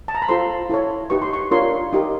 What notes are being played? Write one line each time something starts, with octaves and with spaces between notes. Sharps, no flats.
A5
A#5
B5
F4 A4 C5 C6
E4 A4 C#5
D#4 G4 B4 C#6
C6
C#6
D4 F4 A#4 C#5 C6
D#4 G4 A#4